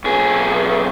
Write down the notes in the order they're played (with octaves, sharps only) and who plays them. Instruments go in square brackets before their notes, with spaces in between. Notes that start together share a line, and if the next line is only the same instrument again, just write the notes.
[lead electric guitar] B1 G#4